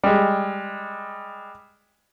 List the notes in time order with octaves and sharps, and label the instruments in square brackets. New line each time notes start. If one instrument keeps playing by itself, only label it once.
[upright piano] G3 G#3